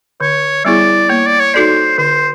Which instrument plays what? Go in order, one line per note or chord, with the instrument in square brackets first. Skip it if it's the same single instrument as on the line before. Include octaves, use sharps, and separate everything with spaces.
[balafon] D3 [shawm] C#5
[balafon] G3 B3 E4 G#4 [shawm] D5
[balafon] A#3 [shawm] C#5
[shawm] D5
C#5
[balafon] D#4 F#4 A4 D5 [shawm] C5
[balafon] D3 [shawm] C5